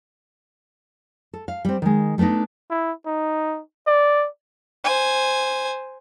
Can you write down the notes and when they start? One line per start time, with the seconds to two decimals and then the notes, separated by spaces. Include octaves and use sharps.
1.33 A4
1.48 F5
1.65 G3 C4
1.82 D#3 G#3
2.18 G3 A3 B3 D4 D#4
2.70 E4
3.06 D#4
3.87 D5
4.84 C5 G#5